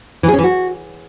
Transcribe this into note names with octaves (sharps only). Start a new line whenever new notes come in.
E3
G#4
C#4
E3
F#4